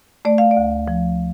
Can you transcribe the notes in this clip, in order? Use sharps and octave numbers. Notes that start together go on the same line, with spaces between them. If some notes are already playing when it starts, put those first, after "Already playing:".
A3 D5
F5
D5
D2
F3